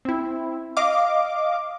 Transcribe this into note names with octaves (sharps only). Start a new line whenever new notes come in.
C4 E4
D#5 F5 D6